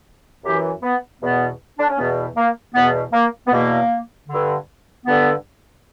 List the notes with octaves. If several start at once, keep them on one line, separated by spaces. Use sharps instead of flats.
F#2 E3 G4
B3
E2 B2 B3
D4
C#4
E2 B2 B3
A#3
E2 B2 B3
A#3
B3
E2 B2 A#3
G2 D3
G2 D3 B3